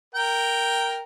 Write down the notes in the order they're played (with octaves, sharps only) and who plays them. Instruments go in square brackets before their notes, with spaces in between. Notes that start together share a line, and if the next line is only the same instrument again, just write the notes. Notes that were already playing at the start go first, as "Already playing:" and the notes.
[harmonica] A#4 G5